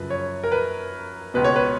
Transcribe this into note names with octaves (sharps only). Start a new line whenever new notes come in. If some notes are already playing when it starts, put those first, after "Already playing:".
Already playing: F#2 C#3 F3 B4
C#5
A#4
B4
C#2 B2 B4
C#5
B4